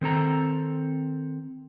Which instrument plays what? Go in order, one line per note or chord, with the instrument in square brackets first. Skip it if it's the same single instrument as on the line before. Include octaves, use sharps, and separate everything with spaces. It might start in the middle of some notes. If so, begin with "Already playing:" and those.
[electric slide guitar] D#3 C4 A4 A#5